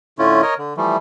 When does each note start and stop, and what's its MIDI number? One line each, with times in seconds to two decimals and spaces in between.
0.19 0.41 45
0.19 0.41 50
0.19 0.41 57
0.19 0.41 61
0.19 0.41 64
0.19 0.41 65
0.42 0.54 70
0.42 0.54 73
0.42 0.54 75
0.58 0.73 50
0.77 0.97 52
0.77 0.97 53
0.77 0.97 55
0.77 0.97 57